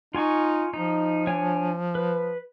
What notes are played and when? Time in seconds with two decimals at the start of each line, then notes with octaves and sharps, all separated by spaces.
0.15 D#4 F4 G#5 C#6
0.74 F3 D#4
1.27 D4 C#5 G#5
1.95 B4